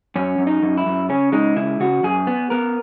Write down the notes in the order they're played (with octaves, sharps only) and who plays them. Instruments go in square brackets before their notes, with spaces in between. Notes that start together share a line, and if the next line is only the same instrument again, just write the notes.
[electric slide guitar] F#2 C#4
F#2
D#4
F#2
E4
F#2
C#3 C#4
G#3 D#4
C#3 E4
C#3 F#4
F#2 G#4
B3
B3 A#4